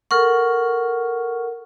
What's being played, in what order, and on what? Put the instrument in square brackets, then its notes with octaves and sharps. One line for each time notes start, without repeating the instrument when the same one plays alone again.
[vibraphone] A4 A#4 F#5 [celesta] C#6 F6